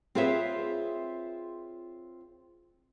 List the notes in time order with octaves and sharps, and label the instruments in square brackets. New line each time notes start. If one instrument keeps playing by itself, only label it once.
[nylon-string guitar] C4 F4 G#4 B4 C#5 E5